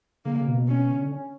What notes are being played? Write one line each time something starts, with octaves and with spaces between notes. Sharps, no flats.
C#3 A#3
C#3
B2
B2
B2 C#4
B2
C#3
D3
C#4